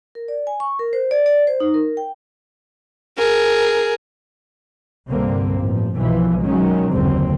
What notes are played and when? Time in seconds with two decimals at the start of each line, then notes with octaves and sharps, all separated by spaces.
0.15 A#4
0.28 D5
0.47 G#5
0.60 C#6
0.79 A#4
0.93 C5
1.11 D5
1.26 D5
1.47 C5
1.60 D#4
1.74 A#4
1.97 G5
3.17 G#4 A#4
5.09 C2 G2 D3 A#3 C4
5.60 A1 F3
5.98 B1 B2 E3 F3
6.42 D#3 F#3 G#3 C#4
6.92 F#1 D#2 D3 C4